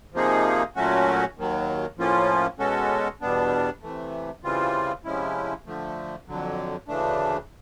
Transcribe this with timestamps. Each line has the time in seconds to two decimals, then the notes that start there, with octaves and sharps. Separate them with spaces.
0.14 C3 F3 A#3 D#4 G#4
0.76 A#2 F#3 A3 C#4 F#4
1.37 D#2 D#3 F#3
1.98 A2 F3 A#3 C#4 F4
2.59 B2 G#3 C#4 F#4 A4
3.21 E2 B2 G3 B3 D4
3.82 C3 E3 A3
4.43 C#3 E3 G3 C4 F4
5.04 C3 F3 G#3 C#4 E4
5.66 D3 F3 A3
6.27 F2 D3 F#3
6.88 D2 C#3 E3 A3 D4